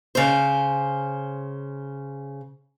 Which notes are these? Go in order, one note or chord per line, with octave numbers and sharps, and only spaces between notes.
C#3 C5